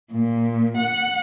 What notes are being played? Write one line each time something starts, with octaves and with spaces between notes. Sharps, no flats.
A#2
F#5